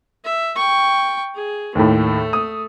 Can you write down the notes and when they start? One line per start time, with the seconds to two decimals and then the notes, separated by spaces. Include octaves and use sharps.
0.24 E5
0.56 G5 C#6
1.35 G#4
1.75 D#2 A2 A3
2.33 D#6